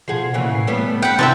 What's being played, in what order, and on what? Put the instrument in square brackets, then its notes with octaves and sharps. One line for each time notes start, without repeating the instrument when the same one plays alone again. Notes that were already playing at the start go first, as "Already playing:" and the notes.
[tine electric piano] B2 F#5 C7 [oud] F3 G#4
[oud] A#2 C#3 E3
[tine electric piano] A2 C7
[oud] G3 A3 B3 [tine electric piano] C#5
[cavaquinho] B4 G5 [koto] F#5
[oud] C3 D4 E4 [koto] C4 [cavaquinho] E5 G5 A5